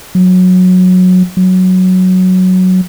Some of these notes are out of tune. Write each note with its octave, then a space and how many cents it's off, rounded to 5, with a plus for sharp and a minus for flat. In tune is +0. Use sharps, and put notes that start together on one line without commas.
F#3 -15
F#3 +0